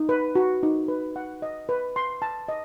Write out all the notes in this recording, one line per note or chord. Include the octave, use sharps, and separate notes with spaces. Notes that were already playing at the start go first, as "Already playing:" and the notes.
Already playing: D#4
B4
F#4
D#4
B4
F#5
D#5
B4
C6
A5
D#5